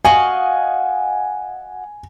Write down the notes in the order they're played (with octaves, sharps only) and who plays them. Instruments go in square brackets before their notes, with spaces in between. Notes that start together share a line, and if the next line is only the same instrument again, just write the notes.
[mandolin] F#4 D#5 F5 [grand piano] G#5